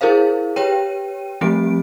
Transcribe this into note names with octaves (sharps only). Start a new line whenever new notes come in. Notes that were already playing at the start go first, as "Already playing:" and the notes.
E4 G#4 A#4 C5 F5
G4 B4 C#5 G5 D#7
F3 G3 A3 C4 G4 D7